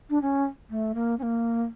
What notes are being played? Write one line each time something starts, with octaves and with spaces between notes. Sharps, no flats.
D4
C#4
A3
A#3
C#4
A#3